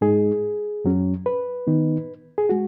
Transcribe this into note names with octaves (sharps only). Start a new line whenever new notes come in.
G#2 G#3 D#4 G#4
F#2 F#3 C#4
B4
D#3 B3 D#4
G#4
G#3 F#4